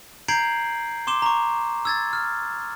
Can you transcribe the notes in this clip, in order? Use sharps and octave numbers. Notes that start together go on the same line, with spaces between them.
A#5 G6 G#6 C7 D7 F#7
C6 D6 E7 G7
A#5 C#6
E6 G#6 A6
F6